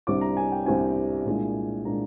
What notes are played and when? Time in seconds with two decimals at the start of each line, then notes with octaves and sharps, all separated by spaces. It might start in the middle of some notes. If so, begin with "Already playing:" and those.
0.07 C2 C3 G3 D4 D6
0.21 A#5
0.37 G#5
0.52 G5
0.66 C2 C3 G3 D4 G#5
1.26 C2 A#2 G#3 D4
1.85 A#2 G#3 D4 A#5